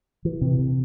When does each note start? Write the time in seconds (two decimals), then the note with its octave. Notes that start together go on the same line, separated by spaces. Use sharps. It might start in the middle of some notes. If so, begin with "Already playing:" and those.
0.25 E3
0.41 C3
0.59 C3